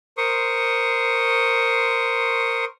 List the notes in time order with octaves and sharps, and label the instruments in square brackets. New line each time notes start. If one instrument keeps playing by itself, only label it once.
[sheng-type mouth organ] A#4 C5 C6 C#6 D#6